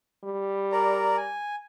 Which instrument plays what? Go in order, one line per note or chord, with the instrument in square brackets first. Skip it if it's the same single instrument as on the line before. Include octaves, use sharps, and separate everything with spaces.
[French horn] G3
[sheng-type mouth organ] A#4 D5 A#5
G#5